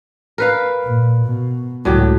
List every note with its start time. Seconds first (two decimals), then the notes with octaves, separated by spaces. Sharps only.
0.38 A#4 B4 F5
0.84 A#2
1.26 B2
1.85 C#2 A2 F#3 G4